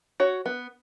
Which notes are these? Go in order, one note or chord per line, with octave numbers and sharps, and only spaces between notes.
F#4 C#5
B3